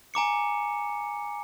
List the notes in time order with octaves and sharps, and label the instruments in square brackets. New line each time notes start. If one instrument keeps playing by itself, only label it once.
[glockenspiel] G#5 A#5 D6 C#7